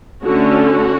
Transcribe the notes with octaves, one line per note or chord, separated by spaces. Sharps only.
D3 A3 C#4 F#4
F#4